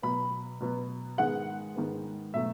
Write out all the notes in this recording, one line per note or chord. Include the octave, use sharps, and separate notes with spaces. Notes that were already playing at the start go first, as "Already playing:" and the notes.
B2 F#3 B3 B5
B2 F#3 B3
G#2 D#3 G#3 B3 F#5
G#2 D#3 G#3 B3
B2 F#3 A3 E5